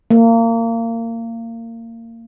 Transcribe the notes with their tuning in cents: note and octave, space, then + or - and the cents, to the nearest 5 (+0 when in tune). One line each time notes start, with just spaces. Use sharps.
A#3 -25